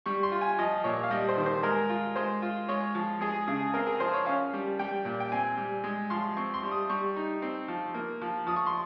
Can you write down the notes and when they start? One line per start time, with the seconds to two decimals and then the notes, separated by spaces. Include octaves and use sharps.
0.06 G3 C#6
0.23 C6
0.32 F4
0.41 G#5
0.59 F3 D#5
0.84 A#2 C#5
1.03 F5
1.10 G3 D#5
1.29 C5
1.37 D#3
1.46 C5
1.63 G#3 A#4
1.89 F4
2.16 G#3 C5
2.42 F4
2.69 G#3 C#5
2.95 F3
3.21 G#3 G#4
3.48 C#3 G#4
3.74 C4 A#4
3.87 G#4
4.00 F3 C5
4.13 C#5
4.26 C#4 F5
4.53 G3
4.79 G3 G5
5.05 A#2
5.20 G5
5.32 C4 G#5
5.57 G3
5.84 G#3
6.10 F3 C6
6.37 C4 C#6
6.54 C6
6.63 G3
6.71 D#6
6.89 G3 C#6
7.16 D#4
7.42 C4
7.68 F3
7.94 A#3
8.22 F3
8.47 F3 D#6
8.56 C#6
8.67 C6